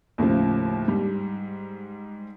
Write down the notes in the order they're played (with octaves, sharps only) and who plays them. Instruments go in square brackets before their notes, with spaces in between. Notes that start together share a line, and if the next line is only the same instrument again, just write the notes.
[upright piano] D#2 A2 C#3 F3
G#2 G3